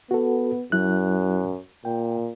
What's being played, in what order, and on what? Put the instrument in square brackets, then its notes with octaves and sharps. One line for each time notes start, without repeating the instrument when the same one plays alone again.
[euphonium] B3 [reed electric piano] F#4 A4
[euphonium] F#2 [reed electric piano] F#3 E4 F#6
[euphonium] A#2 [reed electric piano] G5